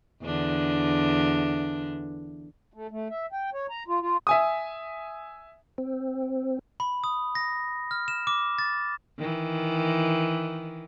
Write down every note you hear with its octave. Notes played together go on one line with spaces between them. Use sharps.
E2 D3 D4
A3
A3
E5
G5
C#5
A#5
F4
F4
E5 G#5 D#6
C4
B5
D#6
A#6
F6
E7
D6
A6
D#3 E3